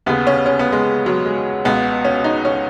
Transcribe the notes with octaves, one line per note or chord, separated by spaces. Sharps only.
D#2 C#3 B3
C#4
C#4
B3
G#3
F#3
G#3
C#2 B2 B3
C#4
D#4
C#4